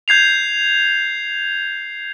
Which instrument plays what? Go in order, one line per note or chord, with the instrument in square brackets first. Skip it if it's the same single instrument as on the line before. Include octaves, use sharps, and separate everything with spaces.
[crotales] G6 G#6 C7 F7